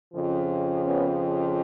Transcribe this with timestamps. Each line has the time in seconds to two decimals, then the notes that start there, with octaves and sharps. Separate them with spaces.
0.12 F2 C#3 F3
0.84 B3 C#4